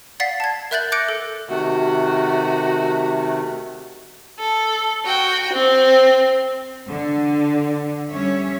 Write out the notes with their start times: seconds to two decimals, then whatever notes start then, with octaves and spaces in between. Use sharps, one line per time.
0.20 D5 F5 F#5 A6 B6 C7
0.40 A5 G#6
0.71 A#4 E5 F#6 G6 A6 F#7
0.92 D6 F#6 G6 A#6 C#7 D7
1.09 A4
1.49 C3 D#3 A3 F#4
4.39 A4
5.06 F#4 G5
5.53 C4
6.89 D3
8.11 G3 C#4 C#5 E5